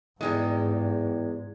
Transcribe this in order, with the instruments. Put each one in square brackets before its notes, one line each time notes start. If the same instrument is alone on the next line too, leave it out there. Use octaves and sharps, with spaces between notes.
[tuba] E2 [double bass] G#2 [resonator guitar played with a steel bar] C3 G3 G#3